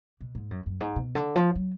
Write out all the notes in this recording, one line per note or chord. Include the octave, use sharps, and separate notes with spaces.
B2
G#2
F#2
F#2
G#2
B2
D3
F3
F#3